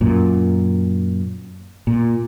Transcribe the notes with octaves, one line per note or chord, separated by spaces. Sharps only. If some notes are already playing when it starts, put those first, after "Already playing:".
F#2 A#2
A#2